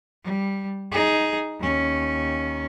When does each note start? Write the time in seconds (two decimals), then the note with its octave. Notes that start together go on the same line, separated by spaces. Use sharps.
0.24 G3
0.92 D#4 G#4
1.60 D#2 C#4